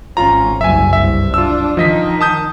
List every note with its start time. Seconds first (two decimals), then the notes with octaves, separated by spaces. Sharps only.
0.17 G#1 C#4 F4 A#5
0.61 F#1 C2 E5 G#5
0.93 C2 G2 E5
1.34 D4 F4 E6
1.77 D#3 F3 D#4 D#5 B6
2.21 A5 D#6 G6